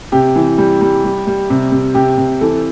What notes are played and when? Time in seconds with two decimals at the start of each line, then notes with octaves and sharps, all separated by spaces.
0.12 C3 G4
0.36 E3
0.58 G3
0.81 G3
1.04 G3
1.27 G3
1.50 C3
1.72 C3
1.94 C3 G4
2.17 C3
2.41 E3 A4